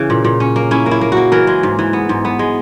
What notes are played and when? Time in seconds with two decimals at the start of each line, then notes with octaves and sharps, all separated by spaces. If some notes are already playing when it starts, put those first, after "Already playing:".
Already playing: C#3 E3
0.10 A#2
0.25 A#2
0.40 C#4
0.56 A#3
0.71 C#4 E4
0.86 A#3
0.91 E4
1.01 A#3
1.12 A#3 F#4
1.32 E3 A#4
1.47 G#3
1.63 G#2
1.79 E3
1.93 B3
2.09 G#2
2.25 B3
2.39 G#3